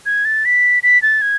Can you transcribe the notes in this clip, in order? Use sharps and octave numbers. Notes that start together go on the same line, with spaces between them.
G#6
A6
B6
B6
A6
G#6